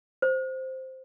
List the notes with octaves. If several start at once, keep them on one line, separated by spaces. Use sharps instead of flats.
C5